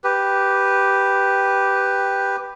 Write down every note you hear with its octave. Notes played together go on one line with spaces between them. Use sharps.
G4 B4